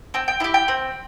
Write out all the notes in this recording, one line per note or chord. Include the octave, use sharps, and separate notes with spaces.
C4 G5
G5
E4 G4 E5
G5
C4